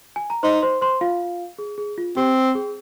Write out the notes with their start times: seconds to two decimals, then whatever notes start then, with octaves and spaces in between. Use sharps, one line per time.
0.16 G#5
0.30 A#5
0.43 D#4 C5 C6
0.62 C5 C6
0.82 C5 C6
1.01 F4 F5
1.59 G#4
1.78 G#4
1.98 F4
2.16 C4 G4
2.55 G#4